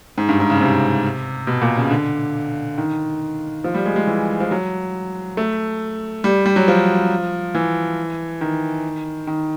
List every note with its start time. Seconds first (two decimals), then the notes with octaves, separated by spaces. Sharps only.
0.18 G#2
0.29 G2
0.40 G#2
0.50 C#3
0.61 C3
1.47 B2
1.62 A#2
1.77 C#3
1.91 D3
2.78 D#3
3.64 F3
3.74 G3
3.86 G#3
3.96 G#3
4.07 E3
4.40 F3
4.51 F#3
5.37 A3
6.24 G3
6.46 G3
6.56 F#3
6.68 F3
7.55 E3
8.41 D#3
9.27 D#3